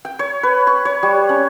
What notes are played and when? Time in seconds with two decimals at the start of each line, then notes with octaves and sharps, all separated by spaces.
0.05 G5
0.19 C#5
0.43 B4
0.67 C#6
0.85 C#5
1.03 G3
1.29 C#4